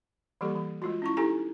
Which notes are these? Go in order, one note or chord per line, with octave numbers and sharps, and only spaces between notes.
E3 G3 A#3 G4 A4
E3
G#3 F4 F#4
C#4 E4 C#6
D#4 E4 G4 A4 G#5 A#5